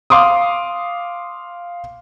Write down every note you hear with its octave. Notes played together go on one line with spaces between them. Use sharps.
F5 C6 D6 D#6